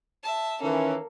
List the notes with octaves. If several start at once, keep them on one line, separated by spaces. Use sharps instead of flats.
E5 A5
D#3 E3 A#3 C#4 A4